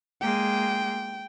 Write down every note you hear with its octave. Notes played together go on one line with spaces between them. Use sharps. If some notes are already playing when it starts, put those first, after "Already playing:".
G#3 A#3 G5